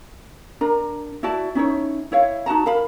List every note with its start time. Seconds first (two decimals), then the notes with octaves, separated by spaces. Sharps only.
0.61 D4 A#4 A#5
1.23 E4 F#4 D5 A5
1.55 C#4 D#4 E4 C#5
2.12 E4 C#5 F5
2.46 D#4 F#4 A5 A#5
2.66 A#4 F5 B5